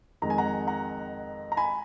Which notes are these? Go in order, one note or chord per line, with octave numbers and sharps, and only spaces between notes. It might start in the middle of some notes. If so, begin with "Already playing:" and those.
F2 D#3 G#3 A#5
G#5
F#5 A#5
F#5 A#5
A#5
G#5 B5